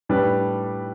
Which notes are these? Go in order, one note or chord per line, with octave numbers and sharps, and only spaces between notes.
A2 G3 D4 B4